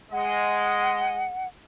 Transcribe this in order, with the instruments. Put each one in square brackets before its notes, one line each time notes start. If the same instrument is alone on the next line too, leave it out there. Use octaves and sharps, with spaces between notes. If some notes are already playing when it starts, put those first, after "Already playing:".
[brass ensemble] G#3 D#5 [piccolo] F#5